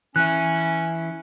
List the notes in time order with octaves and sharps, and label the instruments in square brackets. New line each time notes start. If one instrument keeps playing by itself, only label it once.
[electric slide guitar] E3 E4 [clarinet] C#4 [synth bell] F#6